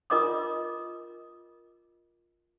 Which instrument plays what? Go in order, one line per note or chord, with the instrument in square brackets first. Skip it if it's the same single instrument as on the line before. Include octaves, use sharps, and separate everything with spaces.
[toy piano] F4 A#4 D#5 D6 D#6